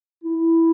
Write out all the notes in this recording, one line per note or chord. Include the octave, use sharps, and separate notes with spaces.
E4